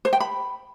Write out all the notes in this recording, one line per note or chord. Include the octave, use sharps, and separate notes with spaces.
C5
G5
B5